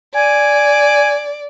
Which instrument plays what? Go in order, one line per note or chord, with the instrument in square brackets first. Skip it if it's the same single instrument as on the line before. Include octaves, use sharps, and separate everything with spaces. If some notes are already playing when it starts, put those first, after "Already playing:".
[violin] D5 [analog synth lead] G#5